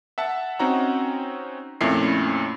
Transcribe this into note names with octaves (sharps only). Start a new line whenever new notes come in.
E5 F#5 A5
C4 C#4 D#4 F#4 F#5 A#5
F2 A#2 A3 C#4 E4 C7